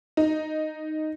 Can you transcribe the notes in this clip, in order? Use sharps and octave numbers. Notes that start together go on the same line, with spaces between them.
D#4